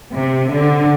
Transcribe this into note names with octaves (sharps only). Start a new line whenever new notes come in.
C3
D3